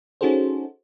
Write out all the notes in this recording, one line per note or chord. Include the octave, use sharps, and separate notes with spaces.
C#4 D#4 F#4 G#4 A4 C5